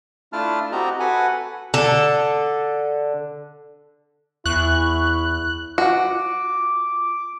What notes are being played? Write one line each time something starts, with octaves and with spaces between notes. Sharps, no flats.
A3 D4 E4 F4 A5 F6
C4 F#4 G4 D#5 A#5
F#4 A4 B4 F#5 G#5
D3 A4
E2 E4 C#6 F#6
F4 F#4 D6